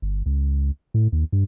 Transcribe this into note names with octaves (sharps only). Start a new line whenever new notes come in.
G1
C#2
A2
D#2
G2